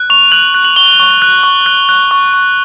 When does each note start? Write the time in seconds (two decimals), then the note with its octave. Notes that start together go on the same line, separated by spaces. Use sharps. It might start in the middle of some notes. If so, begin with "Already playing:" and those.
Already playing: F#6
0.10 C#6 F7
0.32 F#6 F#7
0.54 F#6
0.65 F#7
0.76 C#6 G7
1.00 C#6
1.22 F#6
1.43 C#6
1.66 F#6
1.89 F#6
2.11 C#6
2.34 C#6